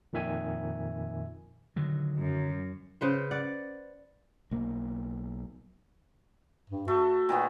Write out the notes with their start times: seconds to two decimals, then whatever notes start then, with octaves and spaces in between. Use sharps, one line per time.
0.13 F2 A#2 D#3 E5 G#5
1.76 D3 D#3 F#3
2.16 F#2
3.01 C#3 B4 C5
3.31 D5 F#5
4.51 B1 A#3
6.70 G2
6.88 A3 F#4
7.29 A#2 D#3 B3